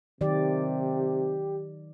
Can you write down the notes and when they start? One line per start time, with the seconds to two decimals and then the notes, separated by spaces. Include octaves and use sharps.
0.21 C3 D#3 F#3 G4 D5